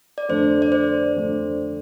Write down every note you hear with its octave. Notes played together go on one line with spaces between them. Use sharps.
D5
F2 D3 A3 D4 C5
D5
C5
F2 D3 A3 D4